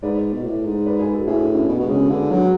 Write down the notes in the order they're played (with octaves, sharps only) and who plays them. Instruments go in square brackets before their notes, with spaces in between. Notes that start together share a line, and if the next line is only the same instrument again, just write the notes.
[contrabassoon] G#2 [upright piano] B4 D5
[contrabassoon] B2
A2
G#2
[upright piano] B4 D5
G#4 B4
F#4 A4
[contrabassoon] A2 [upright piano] E4 G#4
[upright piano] D4 F#4
C#4 E4
[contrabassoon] B2 [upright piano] B3 D4
[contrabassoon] B2 [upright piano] G#3 B3
[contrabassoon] C#3
[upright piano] F#4 A4
[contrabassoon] D3 [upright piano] G#4 B4
[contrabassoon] F#3